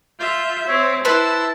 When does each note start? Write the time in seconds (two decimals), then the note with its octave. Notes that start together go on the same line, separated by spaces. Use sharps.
0.20 F4 E5 G6
0.68 C4 C#5 E5
1.05 E4 B4 C5 A5 E6